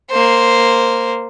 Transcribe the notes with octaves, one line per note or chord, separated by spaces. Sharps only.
A#3 C5